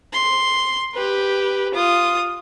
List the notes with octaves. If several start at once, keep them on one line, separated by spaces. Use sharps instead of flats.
C6
G4 B4
F4 D#6